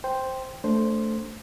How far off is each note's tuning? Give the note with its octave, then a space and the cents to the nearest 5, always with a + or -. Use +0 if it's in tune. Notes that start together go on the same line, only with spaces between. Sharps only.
C5 +0 G5 +0
A3 +0 D4 -20 C5 +0